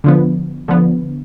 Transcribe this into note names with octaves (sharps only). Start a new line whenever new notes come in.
D3 F3 B3
D3 F3 B3